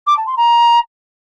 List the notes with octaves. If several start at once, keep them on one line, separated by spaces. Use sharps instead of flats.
D6
A5
C6
A#5